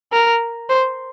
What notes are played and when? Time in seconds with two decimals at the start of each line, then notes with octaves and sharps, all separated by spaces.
0.13 A#4
0.69 C5